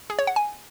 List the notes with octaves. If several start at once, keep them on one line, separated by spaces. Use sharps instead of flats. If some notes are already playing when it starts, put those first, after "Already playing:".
G#4
C#5
F#5
G#5